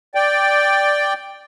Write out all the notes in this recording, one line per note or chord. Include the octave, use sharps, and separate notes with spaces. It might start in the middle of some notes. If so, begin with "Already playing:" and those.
D5 G5